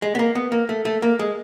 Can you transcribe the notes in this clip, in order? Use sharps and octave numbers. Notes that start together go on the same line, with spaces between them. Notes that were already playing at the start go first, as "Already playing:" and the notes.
G#3
B3
A#3
B3
A#3
A3
A3
A#3
G#3